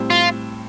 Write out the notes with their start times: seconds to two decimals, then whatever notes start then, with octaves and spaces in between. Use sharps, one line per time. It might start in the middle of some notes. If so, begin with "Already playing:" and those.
Already playing: A2 G3 C4
0.10 F4